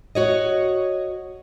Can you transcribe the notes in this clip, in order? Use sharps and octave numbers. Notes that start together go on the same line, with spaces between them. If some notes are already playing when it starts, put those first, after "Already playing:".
F#4 C#5 D#5